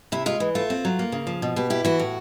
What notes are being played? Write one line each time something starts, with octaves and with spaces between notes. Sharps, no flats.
C3 E4
G#3 F4
E3
A3 F4
C4
F#3
A#3
C#3
F3
B2
B2 G4
E4 G4
E3 F#4
A2